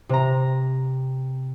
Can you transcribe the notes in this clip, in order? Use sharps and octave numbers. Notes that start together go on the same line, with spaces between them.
C3 A#5